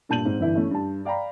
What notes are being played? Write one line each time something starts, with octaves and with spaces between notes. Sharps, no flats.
G2 A#2 A5 G6 D#7 F#7
G#2 C4
G1 D3 E3 E4
A3 C#4 E4
G2 A5
D5 F5 G5 A#5 B5